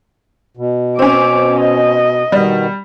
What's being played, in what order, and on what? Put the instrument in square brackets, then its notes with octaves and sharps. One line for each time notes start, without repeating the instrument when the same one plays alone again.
[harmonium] B2
[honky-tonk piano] C4 C#4 [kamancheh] D6
[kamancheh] D#5
[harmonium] B2 D#3 B3 [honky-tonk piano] G3